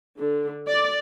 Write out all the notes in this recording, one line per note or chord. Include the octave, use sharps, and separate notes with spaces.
D3
D5